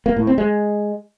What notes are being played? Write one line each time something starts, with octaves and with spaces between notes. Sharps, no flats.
A#3
A2
C4
G#3